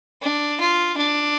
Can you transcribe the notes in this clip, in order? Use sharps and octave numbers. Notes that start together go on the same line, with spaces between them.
D4
F4
D4